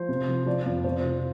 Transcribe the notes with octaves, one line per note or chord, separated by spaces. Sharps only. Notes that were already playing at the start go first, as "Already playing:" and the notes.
Already playing: F3 C5
C3
F3
F3 D5
F2
C3 C5
F3